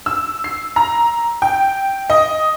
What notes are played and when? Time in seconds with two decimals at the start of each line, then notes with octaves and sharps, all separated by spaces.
0.06 E6
0.44 C7
0.76 A#5
1.42 G5
2.10 D#5